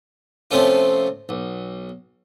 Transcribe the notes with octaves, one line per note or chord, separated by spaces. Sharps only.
C3 F3 A3 C4 C#4 F4
B1